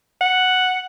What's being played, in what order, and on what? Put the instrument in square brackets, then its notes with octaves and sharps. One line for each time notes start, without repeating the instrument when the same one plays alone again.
[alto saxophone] F#5